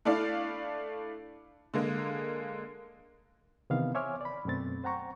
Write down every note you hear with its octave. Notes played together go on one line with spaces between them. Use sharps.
A3 D4 E4 D5 F5
D3 G#3 A#3
C3 D#3 E3 B3 F5
C5 C#5 E5 G#5 D6 F6
D5 B5
F#2 B2 A3 C4 A6
C5 F#5 G5 A#5 C#6